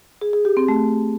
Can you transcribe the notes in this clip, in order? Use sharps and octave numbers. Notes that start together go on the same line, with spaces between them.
G#4
G#4
G4
C4
A3